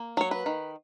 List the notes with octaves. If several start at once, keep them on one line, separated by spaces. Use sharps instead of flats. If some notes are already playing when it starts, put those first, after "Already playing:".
Already playing: A#3
F#3 C#5
B4
D#3